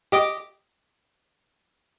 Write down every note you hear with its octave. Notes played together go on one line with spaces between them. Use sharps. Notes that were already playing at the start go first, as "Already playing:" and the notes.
G4 D#5 D6